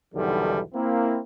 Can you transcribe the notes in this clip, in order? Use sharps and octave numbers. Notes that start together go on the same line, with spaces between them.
B1 E2 D3 D#3 G3 A4
A#3 C4 E4